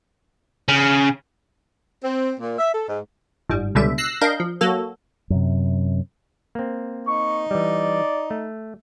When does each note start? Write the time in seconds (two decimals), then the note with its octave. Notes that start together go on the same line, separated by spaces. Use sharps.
0.68 C#3
2.03 C4
2.40 A#2
2.59 E5
2.74 A4
2.89 G#2
3.50 G1 G#2 G3
3.75 C#2 B2 D3 G3 E5
3.98 E6 F#6 A#6 C7
4.21 D4 A#4 D#5 F5 G6
4.40 F3
4.61 F#3 A#3 F#4 A4
5.30 F#2 C3
6.55 A#3 C4
7.07 D#4 C#6
7.51 E3 G3 D5
8.31 A3